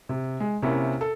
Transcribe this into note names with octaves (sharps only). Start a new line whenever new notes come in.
C3
G#3
C3 A#3 C#4 E4
A4